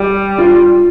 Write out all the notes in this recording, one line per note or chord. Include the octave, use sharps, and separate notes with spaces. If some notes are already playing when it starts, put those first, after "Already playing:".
Already playing: G3
F4